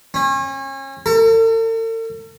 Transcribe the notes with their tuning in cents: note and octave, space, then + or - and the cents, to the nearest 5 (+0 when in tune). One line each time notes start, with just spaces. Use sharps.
C#4 -35
A4 +45